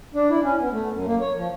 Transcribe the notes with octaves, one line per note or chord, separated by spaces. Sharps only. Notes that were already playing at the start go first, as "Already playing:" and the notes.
D4
E4
C#4
B3
A3
F#2
A#3
C#5
F3